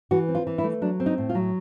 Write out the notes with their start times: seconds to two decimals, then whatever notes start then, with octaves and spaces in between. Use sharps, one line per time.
0.11 E3 F#4
0.28 C4
0.35 F4
0.47 E3
0.58 E4
0.64 A3
0.82 F#3 D4
1.00 C4
1.06 D#4
1.18 A2
1.29 F4
1.35 F#3